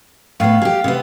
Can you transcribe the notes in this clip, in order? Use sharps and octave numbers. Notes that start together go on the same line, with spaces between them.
A2 B3 F5
G4 G#4
C3 B3